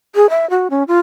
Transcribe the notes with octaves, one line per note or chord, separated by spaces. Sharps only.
G#4
E5
F#4
C#4
F4